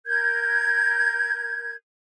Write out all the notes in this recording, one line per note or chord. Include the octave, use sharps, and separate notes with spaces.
A#4 G6 G#6